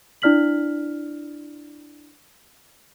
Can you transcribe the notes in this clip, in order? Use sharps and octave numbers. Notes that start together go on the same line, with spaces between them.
D4 E4 D5 F6 B6 F#7